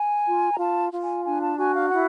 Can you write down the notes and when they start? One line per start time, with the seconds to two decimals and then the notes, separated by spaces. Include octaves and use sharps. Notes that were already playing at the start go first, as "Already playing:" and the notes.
Already playing: G#5
0.26 F4
0.52 A#5
0.58 F4 A5
0.92 F4
1.02 G#5
1.24 D4 G#5
1.41 A5
1.57 F#4 G#5
1.74 F5
1.90 E4 F#5